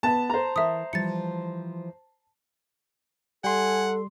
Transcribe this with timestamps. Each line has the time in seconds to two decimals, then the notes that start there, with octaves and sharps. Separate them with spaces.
0.03 B3 A5
0.30 C5 A#5
0.56 E3 A#4 E5 D#6
0.93 E3 F3 G3 A6 C#7
3.44 G3 A4 F#5 G#5 C6